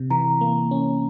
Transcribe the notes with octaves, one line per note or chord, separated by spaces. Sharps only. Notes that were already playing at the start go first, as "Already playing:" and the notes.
Already playing: C3
E3 A#5
A#3
C#4